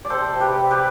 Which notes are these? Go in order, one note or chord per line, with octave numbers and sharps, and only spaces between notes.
D5
C3 A4 C5
C3
G4 B4
C3
G4 B4